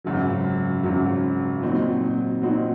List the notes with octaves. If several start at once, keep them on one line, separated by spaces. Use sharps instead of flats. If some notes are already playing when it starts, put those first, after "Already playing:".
G#1 F#2 C#3 F#3
G#1 F#2 C#3 F#3
A#2 F#3 C4 D#4 F#4
A#2 F#3 C4 D#4 F#4